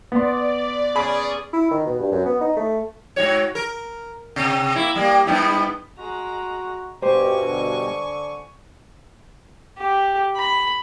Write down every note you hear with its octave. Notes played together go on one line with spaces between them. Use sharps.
B3 D5 C6
C#4 G#4 B5
E4
D#3
B2
G2
F#2
B3
D#4
A3
G#2 F#4 C#5
A#4
C3
A#3 E4
G3 A#3
G2 B3 E4
G#3 F#4 A#5
G2 B2 G4 C5 G#5 C#6
D3
G4
B5